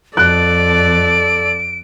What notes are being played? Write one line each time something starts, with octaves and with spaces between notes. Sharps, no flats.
F2 A4 D5 F#6 D7